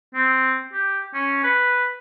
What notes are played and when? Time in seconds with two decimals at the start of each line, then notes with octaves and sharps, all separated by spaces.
0.14 C4
0.73 G4
1.14 C#4
1.44 B4